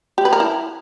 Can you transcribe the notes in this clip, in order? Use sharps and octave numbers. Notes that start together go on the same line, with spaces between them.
G4
B4
A#4
E4